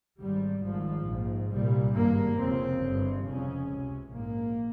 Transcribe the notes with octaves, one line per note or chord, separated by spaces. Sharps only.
G#1 G#2 G3
G#1 G#2 F3
A#1 G#2
C2 A#2 G3
G#1 G2 A#3
F1 F2 C#3 C4
G1 G2
F1 F2 C#3 C#4
C#2 C3
A#1 G#2 A#3